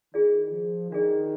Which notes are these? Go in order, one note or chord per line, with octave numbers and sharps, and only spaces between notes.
D#3 D4 F4 G#4 D5
F3
D#3 D4 F4 G#4 D5